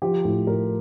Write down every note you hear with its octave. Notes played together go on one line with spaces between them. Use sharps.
F3 G4
A2
A2 A#4